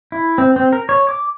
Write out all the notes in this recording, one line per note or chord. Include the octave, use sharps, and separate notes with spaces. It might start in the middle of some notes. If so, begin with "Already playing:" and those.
E4
C4
C4
A#4
C#5
D6